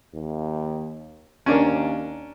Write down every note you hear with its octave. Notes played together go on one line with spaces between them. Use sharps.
D#2
D#2 C#4 D4 A#4